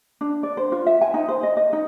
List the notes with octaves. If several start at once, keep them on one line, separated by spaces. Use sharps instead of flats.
D4
D5
C5
F4
E5
G#5
D#4
C5
D#5
D#5
D#4